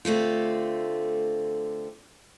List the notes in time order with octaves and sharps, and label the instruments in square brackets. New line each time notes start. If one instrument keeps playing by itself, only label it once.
[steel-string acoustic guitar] D3 A3 C4 F4